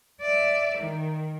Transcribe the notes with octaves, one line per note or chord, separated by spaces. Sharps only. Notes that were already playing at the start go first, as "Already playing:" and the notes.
D5 E5
D#3